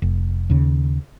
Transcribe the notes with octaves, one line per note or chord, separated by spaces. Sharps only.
F1
D#2 C#3